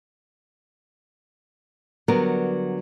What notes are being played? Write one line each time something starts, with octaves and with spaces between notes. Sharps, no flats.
D3 F#3 G3 B3 A#4